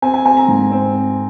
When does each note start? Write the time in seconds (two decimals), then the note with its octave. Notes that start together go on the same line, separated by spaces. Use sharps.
0.02 C4 G#5
0.14 G#5
0.25 C4 G#5
0.37 A#5
0.48 G#2
0.72 C4